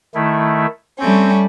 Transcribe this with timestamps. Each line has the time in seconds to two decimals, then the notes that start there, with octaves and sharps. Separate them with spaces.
0.15 D#3 A3 E4
0.99 G3 A3 C4 C#4